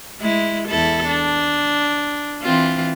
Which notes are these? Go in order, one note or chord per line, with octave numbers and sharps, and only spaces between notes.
G#3 E4
E2 E4 A4
D4
E3 C4 F4